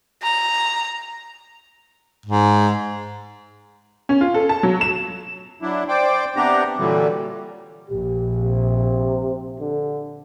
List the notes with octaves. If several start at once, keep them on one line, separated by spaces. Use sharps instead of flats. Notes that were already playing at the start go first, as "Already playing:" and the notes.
A#5
G#2
C#4
F4
A4
A5
F#3
E7
F#3 D4 E4
C5 D5 G5
C3 B3 D4 G4 A#5
A#2 D3 E3 F#3 G3
A#1 G4
C3
D3